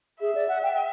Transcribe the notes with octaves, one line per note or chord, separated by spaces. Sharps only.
G#4 E5
D5
F#5
G5
G5